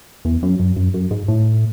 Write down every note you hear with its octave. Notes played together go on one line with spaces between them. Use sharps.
E2
F#2
F#2
F#2
F#2
G#2
A2